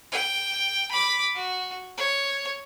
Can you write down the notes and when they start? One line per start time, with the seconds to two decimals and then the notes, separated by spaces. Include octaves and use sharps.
0.12 G5
0.91 B5 D6
1.34 F#4
1.97 C#5